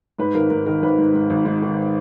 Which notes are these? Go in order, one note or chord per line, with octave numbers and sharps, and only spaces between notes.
G#2 B4
G#1 A#4
G#2 A#4
D#3 A#4
G#1 B4
G#2
G#2
G#1
G#2
D#3